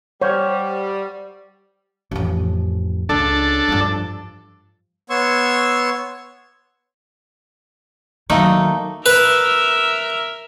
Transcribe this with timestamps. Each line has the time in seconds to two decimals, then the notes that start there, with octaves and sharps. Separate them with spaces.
0.22 G3 C5 C#5 F#5 C#6 F6 G6
2.11 A1 F2
3.09 C#2 D4 A4
3.68 G2 F3
5.10 B3 C#5 C6 C#6 E6
8.30 D#3 F#3 A3 A#3 D#4
9.06 A#4 B4 E5